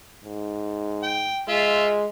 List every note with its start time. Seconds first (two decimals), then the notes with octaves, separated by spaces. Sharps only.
0.25 G#2
1.03 G5
1.48 G#3 F4 E5